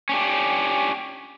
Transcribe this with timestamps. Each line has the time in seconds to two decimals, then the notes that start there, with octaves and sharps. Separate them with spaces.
0.09 C#4 D4 G4